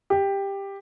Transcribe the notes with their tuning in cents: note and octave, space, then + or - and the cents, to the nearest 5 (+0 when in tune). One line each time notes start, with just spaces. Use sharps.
G4 +10